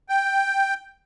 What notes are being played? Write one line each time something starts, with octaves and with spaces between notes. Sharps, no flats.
G5